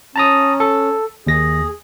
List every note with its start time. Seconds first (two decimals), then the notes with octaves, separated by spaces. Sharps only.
0.16 C#4 A5 A#5 D#6
0.60 A4
1.27 D#2 G#4 A#6